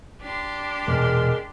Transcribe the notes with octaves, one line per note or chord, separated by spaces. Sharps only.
D4 G4 C6
E1 A#2 G#3 A#4